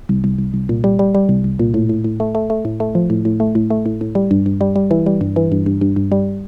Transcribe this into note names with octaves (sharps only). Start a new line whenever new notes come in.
C2
C2
C2
C2
A#2
G3
G3
G3
C2
C2
A#2
A2
A2
A2
A3
A3
A3
A2
A3
F3
A2
A2
A3
A2
A3
A2
A2
G3
G2
G2
G3
G3
E3
G3
G2
E3
G2
G2
G2
G2
G3